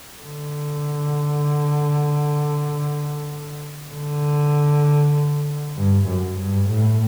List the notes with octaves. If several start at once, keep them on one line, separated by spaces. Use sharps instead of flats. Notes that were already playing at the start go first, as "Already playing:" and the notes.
D3
D3
G2
F#2
G2
A2